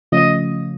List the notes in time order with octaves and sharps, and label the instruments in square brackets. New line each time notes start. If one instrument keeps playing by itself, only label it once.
[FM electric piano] C#3 F3 A3 C#4 F4 [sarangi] D#5